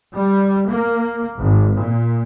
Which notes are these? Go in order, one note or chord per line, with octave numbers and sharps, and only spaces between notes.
G3
A#3
G#1
A#2